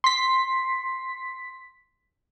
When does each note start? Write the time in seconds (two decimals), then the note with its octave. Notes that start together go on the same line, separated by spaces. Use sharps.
0.04 C6 B6